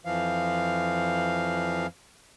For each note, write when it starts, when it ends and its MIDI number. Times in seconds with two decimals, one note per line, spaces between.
0.05 1.87 41
0.05 1.87 52
0.05 1.87 53
0.05 1.87 77